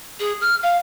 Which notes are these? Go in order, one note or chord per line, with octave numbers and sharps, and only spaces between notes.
G#4
F6
F5